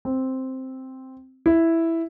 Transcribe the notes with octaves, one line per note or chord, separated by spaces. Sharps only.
C4
E4